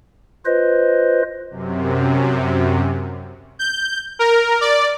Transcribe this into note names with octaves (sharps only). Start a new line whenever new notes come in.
F4 B4 C5 D#5
F#2 C3
G6
A#4
D5